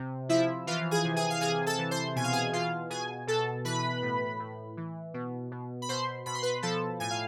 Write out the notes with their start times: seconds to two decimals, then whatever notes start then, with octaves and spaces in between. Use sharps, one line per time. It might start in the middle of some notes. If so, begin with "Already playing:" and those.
Already playing: C3
0.29 F3 E4 E5
0.67 E3 F4 F5
0.91 G#4 G#5
1.05 C3
1.16 G#4 G#5
1.30 F5
1.41 C3 G#4 G#5
1.66 A4 A5
1.79 E3
1.91 C5 C6
2.16 B2 G#5
2.24 F5
2.33 G#4 G#5
2.53 B2 F4 F5
2.90 B2 G#4 G#5
3.27 B2 A4 A5
3.65 E3 B4 B5
4.02 A2
4.40 A2
4.77 E3
5.14 B2
5.52 B2
5.82 B5
5.89 B2 C5 C6
6.26 B2 B5
6.35 C6
6.43 B4 B5
6.62 F3 A4 A5
7.00 A2 G#5
7.10 F5